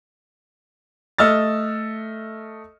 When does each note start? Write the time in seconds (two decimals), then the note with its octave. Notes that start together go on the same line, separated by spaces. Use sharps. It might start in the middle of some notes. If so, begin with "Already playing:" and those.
1.18 A3 D#5 E6 F6 A6